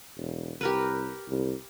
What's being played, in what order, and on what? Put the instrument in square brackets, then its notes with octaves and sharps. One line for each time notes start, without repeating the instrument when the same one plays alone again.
[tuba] E1
[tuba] C2 [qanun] G4 A#4 B4
[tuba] C2